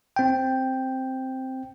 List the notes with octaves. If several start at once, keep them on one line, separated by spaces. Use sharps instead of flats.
C4 G5